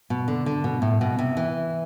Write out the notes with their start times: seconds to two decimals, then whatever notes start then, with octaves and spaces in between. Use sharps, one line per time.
0.10 B2
0.28 D3
0.46 D3
0.64 B2
0.82 A2
1.01 B2
1.19 C3
1.37 E3